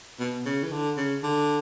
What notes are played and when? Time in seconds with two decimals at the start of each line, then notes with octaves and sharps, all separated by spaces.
0.20 B2
0.46 C#3
0.63 E3
0.72 D3
0.97 C#3
1.23 D3